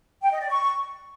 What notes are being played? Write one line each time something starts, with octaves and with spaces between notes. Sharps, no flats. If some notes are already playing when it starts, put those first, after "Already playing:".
G5
D#5
D5
C#6